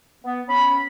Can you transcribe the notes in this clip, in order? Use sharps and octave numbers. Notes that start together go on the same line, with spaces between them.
B3
C#4 B5